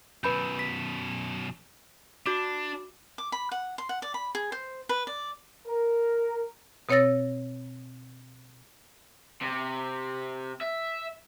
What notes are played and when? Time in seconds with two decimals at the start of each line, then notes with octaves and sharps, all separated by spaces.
0.24 F#2 B2 B4 B5 G6
0.59 B6
2.26 D4 F#4 D6
3.18 D6
3.32 B5
3.52 F#5
3.78 C6
3.89 F#5
4.02 D5
4.14 B5
4.35 G#4
4.52 C5
4.89 B4
5.07 D5
5.66 A#4
6.89 B2 C4 C#5 E6 A6 A#6
9.41 C3
10.61 E5